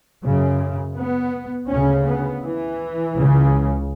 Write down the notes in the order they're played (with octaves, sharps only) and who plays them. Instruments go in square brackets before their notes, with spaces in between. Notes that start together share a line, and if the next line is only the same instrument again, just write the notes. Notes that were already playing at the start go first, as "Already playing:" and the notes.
[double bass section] F#2 C#3
B3
D2 C#3 C#4
B3
E3
C#2 C#3